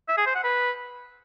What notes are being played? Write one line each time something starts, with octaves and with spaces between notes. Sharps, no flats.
E5
G#4
C5
F#5
B4